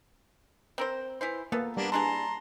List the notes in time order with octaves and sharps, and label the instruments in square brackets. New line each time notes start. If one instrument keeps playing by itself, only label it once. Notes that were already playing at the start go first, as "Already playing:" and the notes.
[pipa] C4 A#4 C5
E3 E4 C5
[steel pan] A#3 [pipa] B3 A4
[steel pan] G3 [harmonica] A#3 B3 D4
[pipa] E3 D4 G#4 [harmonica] A5 A#5 C6